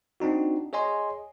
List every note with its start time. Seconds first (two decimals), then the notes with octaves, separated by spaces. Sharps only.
0.20 C4 D4 D#4 F#4
0.73 G#4 C#5 D#5 G#5 C6